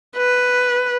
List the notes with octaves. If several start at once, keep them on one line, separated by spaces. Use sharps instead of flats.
B4